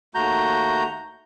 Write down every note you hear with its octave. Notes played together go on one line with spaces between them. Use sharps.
D#2 A3 F#4 A#5 G6